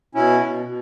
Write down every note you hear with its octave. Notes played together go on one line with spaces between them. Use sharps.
B2 C#4 E4
B2
B2